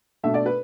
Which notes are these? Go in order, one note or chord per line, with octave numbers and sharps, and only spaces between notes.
B2 A3 D4 E5
D5
B4